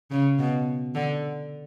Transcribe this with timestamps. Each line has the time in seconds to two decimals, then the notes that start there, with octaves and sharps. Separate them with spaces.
0.11 C#3
0.39 B2
0.95 D3